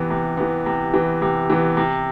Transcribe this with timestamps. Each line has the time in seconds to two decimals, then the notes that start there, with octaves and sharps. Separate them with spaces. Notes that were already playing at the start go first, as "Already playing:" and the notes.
Already playing: C3 E3 B3
0.10 C3
0.37 E3 B3
0.66 C3
0.94 E3 B3
1.22 C3
1.50 E3 B3
1.77 C3